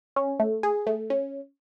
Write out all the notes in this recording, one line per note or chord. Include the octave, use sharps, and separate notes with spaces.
C#4
A3
G#4
A3
C#4